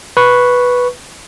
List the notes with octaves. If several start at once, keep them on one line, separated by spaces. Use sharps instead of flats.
B4 C#6